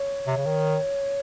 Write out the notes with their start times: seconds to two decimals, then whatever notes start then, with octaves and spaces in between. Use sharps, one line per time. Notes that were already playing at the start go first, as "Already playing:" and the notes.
Already playing: C#5
0.27 C3
0.37 C#3
0.46 D#3